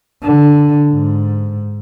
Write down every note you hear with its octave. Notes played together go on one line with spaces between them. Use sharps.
D3
G#2